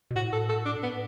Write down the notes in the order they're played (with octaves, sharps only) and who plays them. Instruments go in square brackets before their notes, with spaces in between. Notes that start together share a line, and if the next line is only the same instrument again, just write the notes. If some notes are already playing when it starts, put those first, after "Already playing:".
[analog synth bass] B2
[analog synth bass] A2 [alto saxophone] F#4
[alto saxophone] A4
A4
D4
B3